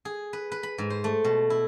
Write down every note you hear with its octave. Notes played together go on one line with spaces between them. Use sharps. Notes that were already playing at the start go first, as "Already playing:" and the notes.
G#4
B4
B4
B5
G#2
C5
A3
B2
E4